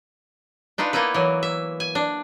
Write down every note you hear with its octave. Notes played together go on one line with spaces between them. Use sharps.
D4 D#4 F4 B4
A#3 B3 D#4 E4 B4
E3 F#3
E5
G#5
D4